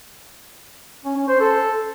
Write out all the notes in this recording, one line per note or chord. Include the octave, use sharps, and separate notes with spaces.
C#4
C#4
C5
A4